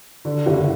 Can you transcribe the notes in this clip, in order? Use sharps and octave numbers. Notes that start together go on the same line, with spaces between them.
D3
F#1